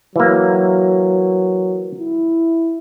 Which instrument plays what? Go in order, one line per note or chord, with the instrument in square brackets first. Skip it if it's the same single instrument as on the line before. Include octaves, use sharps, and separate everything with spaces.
[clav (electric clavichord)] E3 A#3 [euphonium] F#3
[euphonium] E4